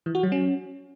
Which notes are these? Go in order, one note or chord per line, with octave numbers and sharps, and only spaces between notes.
E3
F#4
F#3
C#4